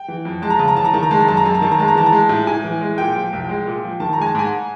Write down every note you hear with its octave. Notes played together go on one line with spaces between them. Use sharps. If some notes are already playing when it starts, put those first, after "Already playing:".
Already playing: G5
E3
F2
G#3 A5
A#5
C#3 A5
A#5
E3 A5
A#5
D#3 A5
A#5
G#3 A5
A#5
F#2 A5
A#5
F#2 A5
A#5
D#3 A5
A#5
G#3 A5
A#5
E3 A5
A#5
G#3 A5
A2
A2 G#5
E3
G#3
A#2 G5
F3
C2
G#3
A#2
F3
D#3 A5
A#5
G#3 G#5
A5
G#2 G#5